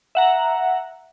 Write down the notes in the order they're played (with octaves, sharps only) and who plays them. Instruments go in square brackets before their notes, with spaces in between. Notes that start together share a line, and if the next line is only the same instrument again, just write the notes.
[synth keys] E5 F#5 A#5